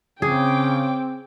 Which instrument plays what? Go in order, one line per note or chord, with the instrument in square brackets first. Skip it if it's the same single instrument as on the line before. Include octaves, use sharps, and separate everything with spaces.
[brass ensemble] C#3 [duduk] C4 [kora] G#4 [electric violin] G5 D6